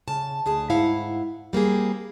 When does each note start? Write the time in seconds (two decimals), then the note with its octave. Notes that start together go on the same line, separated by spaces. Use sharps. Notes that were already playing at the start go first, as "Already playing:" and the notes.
0.08 C#3 A5
0.46 D2 G#4 A5
0.70 G#2 E4 F5 F#5
1.53 G3 A#3 C4 G#4